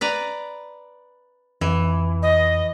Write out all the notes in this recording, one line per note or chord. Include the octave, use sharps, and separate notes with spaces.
B4 D5 A#5
F2 E3
D#5